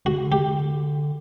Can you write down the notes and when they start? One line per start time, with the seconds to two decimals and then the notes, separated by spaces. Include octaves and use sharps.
0.05 D3 F#4
0.16 C#3
0.26 D3
0.32 G4